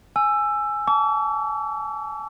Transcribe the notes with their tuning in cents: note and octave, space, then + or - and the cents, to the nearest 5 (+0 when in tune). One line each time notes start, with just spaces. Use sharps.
G#5 +5 E6 +15
A5 -20 D6 -45